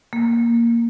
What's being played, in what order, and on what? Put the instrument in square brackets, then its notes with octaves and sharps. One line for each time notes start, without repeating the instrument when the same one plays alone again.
[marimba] A#3